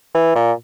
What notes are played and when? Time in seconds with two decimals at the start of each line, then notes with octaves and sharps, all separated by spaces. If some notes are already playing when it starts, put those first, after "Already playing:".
0.14 E3
0.35 A#2